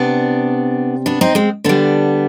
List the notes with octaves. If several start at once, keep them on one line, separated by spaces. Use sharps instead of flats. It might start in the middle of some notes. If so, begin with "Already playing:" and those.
Already playing: C3 B3 D4
B3 D4
C4 D#4
G#3 C4
D3 G3 B3 D4